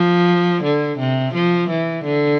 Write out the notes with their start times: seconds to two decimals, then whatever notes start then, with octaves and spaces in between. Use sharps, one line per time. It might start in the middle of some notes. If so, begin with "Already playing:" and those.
Already playing: F3
0.64 D3
0.99 C3
1.34 F3
1.70 E3
2.05 D3